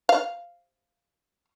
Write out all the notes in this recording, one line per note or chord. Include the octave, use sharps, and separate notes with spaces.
F5